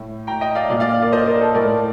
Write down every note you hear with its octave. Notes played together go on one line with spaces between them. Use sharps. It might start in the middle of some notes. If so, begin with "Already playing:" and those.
Already playing: A2
G5 A#5
D#5 G5
D5 F5
A#2 D5 F5
D5 F5
A#4 D5
C5 D#5
A#4 D5
A4 C5
A2 A#4 D5